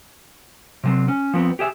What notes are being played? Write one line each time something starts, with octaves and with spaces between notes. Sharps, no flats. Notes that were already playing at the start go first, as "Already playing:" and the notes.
C3 F#3 C4
C#4
F3 B3 C4
G4 G#4 E5